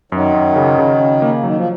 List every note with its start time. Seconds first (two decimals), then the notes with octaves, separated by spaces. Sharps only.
0.12 F#2 D#3 F#3
0.34 F#2
0.56 C#3
0.78 C#3
1.00 C#3
1.22 A#3
1.44 D#3 F#3
1.56 F3